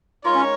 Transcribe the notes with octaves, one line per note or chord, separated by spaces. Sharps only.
G#3 D#4 F4 A#4 C#5
C#4